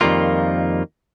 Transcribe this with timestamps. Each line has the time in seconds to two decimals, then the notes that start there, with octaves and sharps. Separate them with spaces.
0.01 F2 D#3 G3 A#3 F4